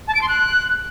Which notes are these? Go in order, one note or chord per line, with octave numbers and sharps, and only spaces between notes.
A5
D7
C6
F#6